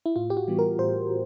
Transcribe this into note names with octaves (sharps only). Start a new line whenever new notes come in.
E4
A2 F4
G4
F#4
E3 G3 B3
A#4
A2 C5